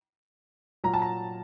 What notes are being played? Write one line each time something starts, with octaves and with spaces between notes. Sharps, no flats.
A#2 F#3 A#5
A5
A#5